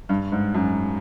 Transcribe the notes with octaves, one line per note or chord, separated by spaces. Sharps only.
G2
G#2
F#2